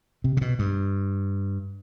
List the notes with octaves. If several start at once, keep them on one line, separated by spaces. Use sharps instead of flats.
C3
C3
B2
G2